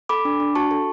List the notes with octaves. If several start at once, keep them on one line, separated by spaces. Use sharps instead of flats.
A4 B5 D6
D4
D4
F#4 A5 C#6
A4